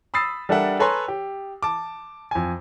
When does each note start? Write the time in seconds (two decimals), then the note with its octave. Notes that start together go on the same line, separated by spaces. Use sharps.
0.14 B5 D#6 E6 A6 C7
0.49 G3 D4 A4 A#4 E5 F#5
0.79 A4 B4 C#5 G#5 A#5 C6
1.08 G4
1.63 A5 D6
2.31 F2 G#5